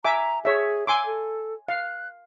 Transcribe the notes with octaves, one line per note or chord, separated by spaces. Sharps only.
E5 G#5 A#5 D6
G#4 C#5 E5
G#5 C6 D6 E6
A4
F5 F#6